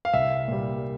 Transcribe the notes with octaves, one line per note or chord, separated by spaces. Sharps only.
F5
C2 E5
A#2 G3